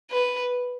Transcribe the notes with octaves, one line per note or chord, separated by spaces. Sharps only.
B4